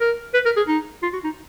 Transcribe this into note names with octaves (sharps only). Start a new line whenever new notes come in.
A#4
B4
A#4
G#4
D#4
F4
F#4
D#4